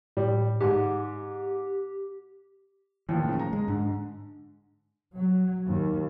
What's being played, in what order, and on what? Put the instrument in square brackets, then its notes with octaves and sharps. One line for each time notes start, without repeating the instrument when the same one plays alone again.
[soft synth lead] A2 [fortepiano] G3
[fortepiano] G#2 [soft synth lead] G4
[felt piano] D#2 A2 F3 [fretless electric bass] E3
[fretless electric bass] C#3
[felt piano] A#5
[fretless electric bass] G#3
[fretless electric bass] G#2 [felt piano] D3
[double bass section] F#3
D#2